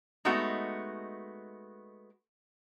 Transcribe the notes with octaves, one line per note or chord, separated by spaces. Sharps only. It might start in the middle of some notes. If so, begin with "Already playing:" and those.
G#3 A3 B3 D#4 F#4